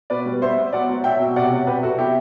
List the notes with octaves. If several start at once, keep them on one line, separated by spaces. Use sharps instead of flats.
B2 B4 D5
G3
B3 C5 E5
B3
F#3 D5 F#5
F#3
F#3 E5 G5
B2
C3 D5 F#5
F#3
C3 G4 B4
C3 F#4 A4
B3 E4 G4